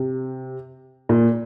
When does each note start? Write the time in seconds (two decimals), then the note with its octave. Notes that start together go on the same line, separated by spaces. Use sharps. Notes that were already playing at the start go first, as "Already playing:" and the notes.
Already playing: C3
1.09 A#2